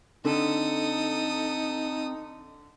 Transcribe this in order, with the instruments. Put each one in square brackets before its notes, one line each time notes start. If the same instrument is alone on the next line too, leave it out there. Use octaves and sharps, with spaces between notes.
[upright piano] D3 [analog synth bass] C4 [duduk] D#4 [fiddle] A4 D#6